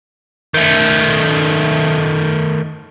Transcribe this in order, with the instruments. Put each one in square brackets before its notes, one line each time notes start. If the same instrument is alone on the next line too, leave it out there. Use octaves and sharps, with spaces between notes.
[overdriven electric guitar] D#3 A3